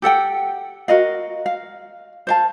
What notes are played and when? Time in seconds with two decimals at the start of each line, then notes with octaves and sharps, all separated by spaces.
0.02 G4 A4 F#5 G5
0.88 F#4 A#4 D#5 F5
1.46 F5
2.27 C5 F5 A5